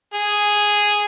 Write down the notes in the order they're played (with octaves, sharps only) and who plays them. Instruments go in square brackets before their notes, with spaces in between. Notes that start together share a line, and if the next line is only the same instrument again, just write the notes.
[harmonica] G#4